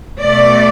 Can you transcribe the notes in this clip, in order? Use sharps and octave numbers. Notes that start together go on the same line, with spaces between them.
B2 A3 D5